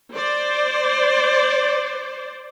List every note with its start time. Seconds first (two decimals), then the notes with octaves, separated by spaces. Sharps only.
0.15 C5 D5